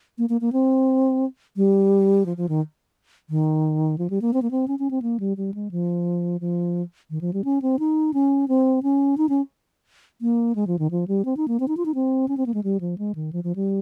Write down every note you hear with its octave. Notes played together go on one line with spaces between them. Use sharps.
A#3
A#3
A#3
C4
G3
F3
F3
D#3
D#3
F3
G3
A#3
C4
A#3
C4
C#4
C#4
C4
A#3
G3
G3
G#3
F3
F3
D#3
F3
G3
C#4
C4
D#4
C#4
C4
C#4
D#4
C#4
A#3
G#3
F3
D#3
F3
G3
C4
D#4
A#3
C4
D#4
F4
D#4
C4
C#4
C4
A#3
G#3
G3
F3
G#3
D#3
F3
F3
G3